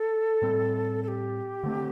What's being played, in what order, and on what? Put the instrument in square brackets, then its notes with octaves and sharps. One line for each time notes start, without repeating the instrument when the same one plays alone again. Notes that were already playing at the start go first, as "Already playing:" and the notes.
Already playing: [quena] A4
[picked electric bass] A2 G3 C4
[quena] A4
G4
[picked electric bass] D3 A3 C4